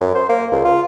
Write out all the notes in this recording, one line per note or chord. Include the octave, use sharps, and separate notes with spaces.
F#2
C5
A#3
C#2
F4